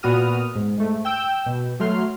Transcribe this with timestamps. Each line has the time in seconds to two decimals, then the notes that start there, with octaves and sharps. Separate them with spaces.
0.03 A#2 B3 F#4 D#6 F6
0.55 G#2
0.77 G#2 A3
1.05 G5 E6 G6
1.46 B2
1.80 F#3 A3 C6 F6